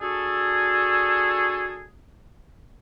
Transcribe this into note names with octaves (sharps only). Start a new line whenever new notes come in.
D4 F#4 G#4 A4